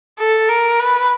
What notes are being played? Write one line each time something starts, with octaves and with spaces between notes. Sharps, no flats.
A4
A#4
B4